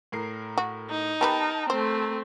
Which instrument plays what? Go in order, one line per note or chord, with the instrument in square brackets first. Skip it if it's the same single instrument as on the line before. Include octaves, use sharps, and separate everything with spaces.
[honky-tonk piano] A2 A#4 C7
[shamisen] F#4
[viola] D#4
[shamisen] B3 G4 B4 [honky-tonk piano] A#4 G5 A5
[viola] A3 C4 [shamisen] C5